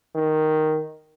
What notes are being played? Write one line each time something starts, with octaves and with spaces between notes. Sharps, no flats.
D#3